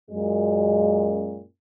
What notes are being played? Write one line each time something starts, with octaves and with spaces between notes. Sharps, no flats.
F#2 A#2 G#3